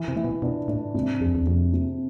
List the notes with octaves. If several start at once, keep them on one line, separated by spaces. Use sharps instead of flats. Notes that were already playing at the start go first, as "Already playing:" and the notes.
Already playing: E3
C3
E3
B2
B2 D4
A2 D4
G#2 C3
F2 G#4
E2
F2 C3
C3